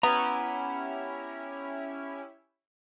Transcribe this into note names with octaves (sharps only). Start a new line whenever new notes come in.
B3 C#4 E4 G4 A#5